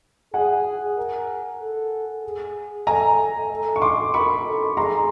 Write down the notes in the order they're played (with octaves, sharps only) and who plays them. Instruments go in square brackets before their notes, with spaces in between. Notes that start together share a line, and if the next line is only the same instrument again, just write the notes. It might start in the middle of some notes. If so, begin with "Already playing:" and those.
[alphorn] G#4 [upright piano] F#5 G#5
[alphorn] A#4
A4
G#4
[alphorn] A4 [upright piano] G#5 A#5
[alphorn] A4
[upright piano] C#6
C6 D6
[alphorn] A#4 [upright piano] B5 C#6
[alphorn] A4
[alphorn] G#4 [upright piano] A#5 C6